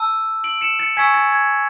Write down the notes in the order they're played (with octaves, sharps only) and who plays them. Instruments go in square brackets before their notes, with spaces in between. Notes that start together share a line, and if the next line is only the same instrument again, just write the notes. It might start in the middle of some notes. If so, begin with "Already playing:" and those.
Already playing: [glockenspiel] A5 E6
D7 F#7
C#7 E7
A6 C#7
G#5 C#6 E6 G#6 B6
A6
G#6